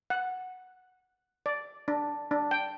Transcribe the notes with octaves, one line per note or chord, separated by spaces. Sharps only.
F#5
D5
D4
D4
G5